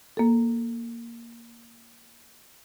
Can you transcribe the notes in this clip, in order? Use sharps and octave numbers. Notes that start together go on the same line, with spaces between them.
A#3 A4